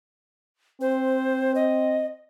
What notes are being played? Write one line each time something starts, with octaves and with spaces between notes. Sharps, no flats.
C4 C5
D#5